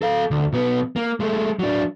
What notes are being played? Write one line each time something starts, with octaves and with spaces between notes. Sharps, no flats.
A4 F5
D2
B1 B3
A#3
G#3 A3
F#3 D4